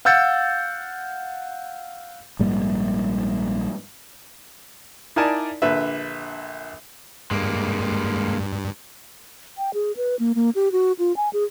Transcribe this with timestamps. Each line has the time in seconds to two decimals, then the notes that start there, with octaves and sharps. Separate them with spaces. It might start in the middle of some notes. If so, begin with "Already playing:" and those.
0.05 F5 F#5 E6 G6 A6 C#7
2.39 A#1 G#2 G3 A#3
5.16 D#4 E4 A#4 D5 G#5 A5
5.62 A#1 D3 B4 E5
7.31 G2 G#3 A#3
9.58 G5
9.74 G#4
9.97 B4
10.19 A#3
10.35 A#3
10.55 G4
10.72 F#4
10.99 F4
11.17 G#5
11.33 G#4